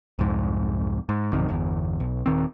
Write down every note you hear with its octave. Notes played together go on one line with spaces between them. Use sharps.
C2 F2 G#2
G#2
A#1 F#2 C3 D#3
G1 E2
B1
D#1 D#3 C4